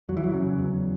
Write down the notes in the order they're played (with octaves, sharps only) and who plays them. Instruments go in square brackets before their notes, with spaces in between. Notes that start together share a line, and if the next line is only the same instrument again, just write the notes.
[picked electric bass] E2 F#3
E3
F#3
C#3
E2